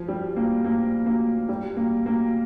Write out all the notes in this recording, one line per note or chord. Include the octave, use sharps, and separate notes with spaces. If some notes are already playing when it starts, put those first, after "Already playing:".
Already playing: F3
G3
A#3
A#3
A#3
G3
A#3
A#3